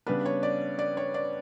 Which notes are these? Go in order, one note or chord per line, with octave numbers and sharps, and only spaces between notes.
C#3 G3 B3 D4 B4
C#5
D5
D5
C#5
D5